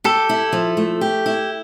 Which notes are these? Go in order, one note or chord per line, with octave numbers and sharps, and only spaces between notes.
G4 A4
E4
F3
A3
G4
E4